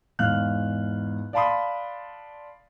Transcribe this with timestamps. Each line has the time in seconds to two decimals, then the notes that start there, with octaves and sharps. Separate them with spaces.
0.19 E2 G#2 F5 F6 F#6
1.33 D5 F5 A5 B5 C6 D#6